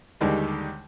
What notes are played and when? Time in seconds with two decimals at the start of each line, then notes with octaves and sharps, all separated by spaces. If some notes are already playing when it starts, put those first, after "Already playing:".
0.21 D#2 D3 D#3 G3 G#3